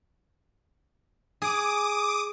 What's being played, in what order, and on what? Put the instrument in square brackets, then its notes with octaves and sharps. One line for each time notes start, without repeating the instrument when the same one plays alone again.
[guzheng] G#4 [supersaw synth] D6 D#6